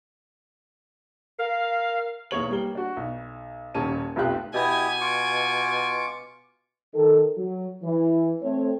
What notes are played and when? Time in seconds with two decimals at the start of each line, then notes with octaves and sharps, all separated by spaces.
1.39 A#4 F5
2.31 B1 E2 A#3 C#5 F#7
2.51 G3 A#3 G7
2.75 D4 F#4
2.97 B1
3.74 D#1 D#2 A#3 C#4 A5 D#7
4.16 F1 B1 F4 G4 F#6
4.54 B2 E4 G4 G#5 D#6
5.01 F4 C#6 D6
6.94 D#3 A4
7.37 F#3
7.83 E3
8.42 A3 C4 C#5